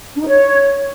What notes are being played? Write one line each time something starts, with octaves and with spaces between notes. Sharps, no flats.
D4
D#4
C#5